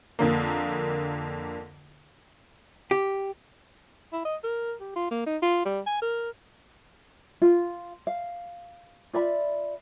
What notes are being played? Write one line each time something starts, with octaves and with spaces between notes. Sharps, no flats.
F2 D3 A#3
G4
E4
D#5
A#4
G4
F4
A#3
D#4
F4
G3
G#5
A#4
F4
F5
F4 D5 E5 B5